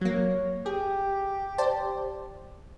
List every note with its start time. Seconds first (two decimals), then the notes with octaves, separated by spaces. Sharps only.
0.01 F#3 A#3 C#5
0.66 G4 G#4
1.58 C5 D5 A5